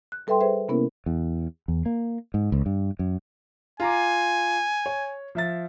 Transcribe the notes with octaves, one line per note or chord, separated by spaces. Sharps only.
F#6
G3 A4 B4 E5 G5 C6
G#4 B4 C5 E5
C3 A#3 B3 C#4 E4 A#4
E2
E2
A#3
G#2
C#2
G2
F#2
F4 G#5 A#5 D6
C#5
F3 E5 A6